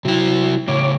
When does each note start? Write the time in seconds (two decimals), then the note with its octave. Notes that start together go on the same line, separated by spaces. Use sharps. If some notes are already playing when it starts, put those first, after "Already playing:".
0.05 C3 F#3 E4
0.68 A2 C#3 C#5 D6